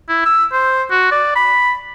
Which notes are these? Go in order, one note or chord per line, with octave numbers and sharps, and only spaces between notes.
E4
E6
C5
F#4
D5
B5